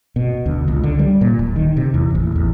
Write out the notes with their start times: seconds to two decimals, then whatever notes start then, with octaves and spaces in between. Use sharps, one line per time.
0.16 B2
0.46 D2
0.68 C#2
0.83 D3
0.99 G3
1.21 A#2
1.39 D1
1.56 D#3
1.77 C3
1.94 E2
2.15 A1
2.36 E2